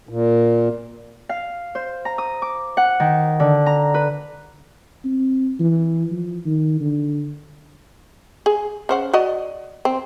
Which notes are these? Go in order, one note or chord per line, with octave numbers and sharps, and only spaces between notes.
A#2
F5
C5
A#5
D#6
D6
F#5
D#3
D3
A#5
B4
C4
E3
F3
D#3
D3
G#4
C#3 C5 F#5
F#4 D5 D#5
C4